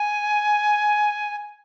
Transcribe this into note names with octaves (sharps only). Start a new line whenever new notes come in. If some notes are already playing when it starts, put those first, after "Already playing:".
Already playing: G#5